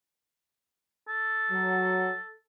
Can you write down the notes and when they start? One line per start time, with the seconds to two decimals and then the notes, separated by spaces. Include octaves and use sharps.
1.08 A4
1.51 F#3